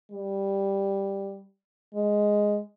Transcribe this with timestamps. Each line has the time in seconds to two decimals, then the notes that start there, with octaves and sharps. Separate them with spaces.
0.11 G3
1.94 G#3